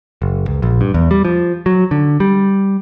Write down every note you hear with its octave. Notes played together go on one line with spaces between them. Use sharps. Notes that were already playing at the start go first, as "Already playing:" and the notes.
F#1
C#2
A#1
G2
E2
G3
F3
F#3
D3
G3